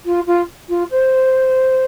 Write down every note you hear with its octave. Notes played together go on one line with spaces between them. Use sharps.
F4
F4
F4
C5